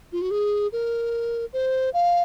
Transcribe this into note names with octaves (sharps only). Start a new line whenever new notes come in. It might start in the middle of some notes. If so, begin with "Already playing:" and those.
F4
F#4
G#4
A#4
C5
F5